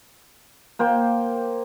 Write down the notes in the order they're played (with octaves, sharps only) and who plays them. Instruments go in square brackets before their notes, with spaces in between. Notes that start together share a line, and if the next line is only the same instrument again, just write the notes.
[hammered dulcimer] A#3 C5 G5